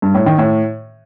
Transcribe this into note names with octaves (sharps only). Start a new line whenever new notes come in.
G2
A2
D#3
A2